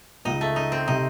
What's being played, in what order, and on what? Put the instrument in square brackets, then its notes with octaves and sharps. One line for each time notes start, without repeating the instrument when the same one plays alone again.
[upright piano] C#2 C#3 [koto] D#4
[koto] A3
D#4
C4
[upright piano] C3 [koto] D#4